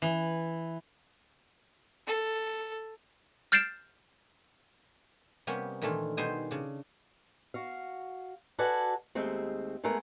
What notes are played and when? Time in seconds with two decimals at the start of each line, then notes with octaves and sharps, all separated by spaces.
0.02 E3
2.07 A4
3.52 F6 G6 A6 C7 D7 E7
5.47 C3 G3 A#3 B3 C#4
5.82 A#2 D#3 E3 A3 D4 F4
6.17 B2 G3 D#4 C5 D#5 G#5
6.51 C#3 D4
7.54 F#4 F5
8.59 F#4 A4 B4 D5 F#5 G#5
9.15 D#2 G#3 A3 C4
9.84 G#3 A3 B3 G#4 A#4